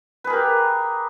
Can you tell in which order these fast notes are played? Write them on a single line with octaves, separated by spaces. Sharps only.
B4 G#4 A#4 G4